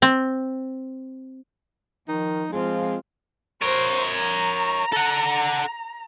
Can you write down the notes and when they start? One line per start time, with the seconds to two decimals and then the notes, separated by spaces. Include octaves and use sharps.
0.02 C4
2.08 D#3 F3 D#4
2.53 F3 G#3 C4 F4
3.62 A#4 C5 C#5
4.10 A#5
4.92 A4 F#5